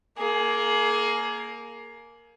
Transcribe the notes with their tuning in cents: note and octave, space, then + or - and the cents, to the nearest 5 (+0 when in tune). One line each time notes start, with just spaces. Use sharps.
A#3 +0 G#4 +25